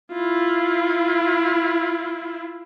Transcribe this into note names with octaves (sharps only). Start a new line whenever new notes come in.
E4 F4